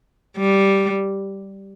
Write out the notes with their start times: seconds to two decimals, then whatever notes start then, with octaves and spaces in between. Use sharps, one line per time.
0.37 G3